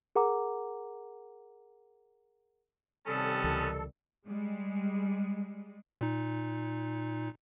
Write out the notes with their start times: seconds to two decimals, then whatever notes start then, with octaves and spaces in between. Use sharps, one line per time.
0.15 G#4 A#4 F#5 A#5 D6
3.07 C3 D#3 G3 B3 C#4 A4 A5
3.44 C#2 E3
4.26 G3 G#3
6.01 A#2 D#4